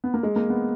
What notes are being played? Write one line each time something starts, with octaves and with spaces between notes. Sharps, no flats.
B3
A#3
G#3
A#3
B3